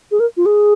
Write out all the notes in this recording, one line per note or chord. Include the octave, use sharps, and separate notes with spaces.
G#4
A#4
F4
G#4